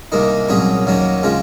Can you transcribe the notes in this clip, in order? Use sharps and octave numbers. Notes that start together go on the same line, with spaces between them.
C2 C3 D#3 A#3 D#4
C2 A#2 F#3 C#4 G#4
D#2 D#3 F#3 A#3 C#4
C#3 G#3 C#4 F4